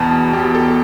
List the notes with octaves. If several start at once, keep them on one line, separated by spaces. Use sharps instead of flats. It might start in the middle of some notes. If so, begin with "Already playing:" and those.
Already playing: E2 B2 A5 B5
E2 G4
A4